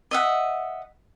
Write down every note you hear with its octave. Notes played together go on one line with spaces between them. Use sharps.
D#5 E5 F#5